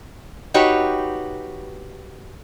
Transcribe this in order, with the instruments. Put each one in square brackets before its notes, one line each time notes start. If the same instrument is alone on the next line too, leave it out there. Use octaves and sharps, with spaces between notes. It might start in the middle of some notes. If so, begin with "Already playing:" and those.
[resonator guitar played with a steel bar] D#4 F#4 G4 B4 C#5